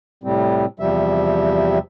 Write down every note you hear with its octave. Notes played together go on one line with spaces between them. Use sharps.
A2 C3 G3 C4
E2 C3 F3 G3 E5